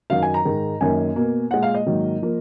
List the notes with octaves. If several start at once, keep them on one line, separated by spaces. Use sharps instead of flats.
F#2 D#3 F#3 F5
G#5
A#5
G#2 D#3 G#3
F#2 D#3 A#3 G#5
B2 A#3
A#2 G#3 F#5
F5
D#5
G#2 D#3 F#3 A#3
F3 A#3